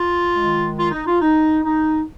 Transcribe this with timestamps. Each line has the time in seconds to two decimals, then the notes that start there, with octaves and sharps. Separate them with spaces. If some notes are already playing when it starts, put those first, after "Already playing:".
Already playing: F4
0.35 D#3 G#3
0.78 F4
0.91 D#4
1.06 F4
1.21 D#4
1.63 D#4